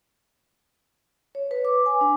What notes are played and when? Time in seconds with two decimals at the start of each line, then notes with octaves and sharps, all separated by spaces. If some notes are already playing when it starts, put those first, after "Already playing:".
1.35 C#5
1.51 B4
1.65 D6
1.86 G#5
2.01 D4